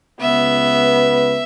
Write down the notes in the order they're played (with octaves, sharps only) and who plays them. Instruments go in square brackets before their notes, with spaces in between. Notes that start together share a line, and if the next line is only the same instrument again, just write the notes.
[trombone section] C#2 B4 [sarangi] B3 [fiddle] E5